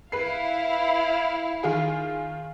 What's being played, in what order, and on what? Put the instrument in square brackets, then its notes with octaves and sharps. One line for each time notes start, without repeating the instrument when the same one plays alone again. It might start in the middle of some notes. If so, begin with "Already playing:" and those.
[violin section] E4 F5 [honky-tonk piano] B4 C7
[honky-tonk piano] D#3 F4 G#4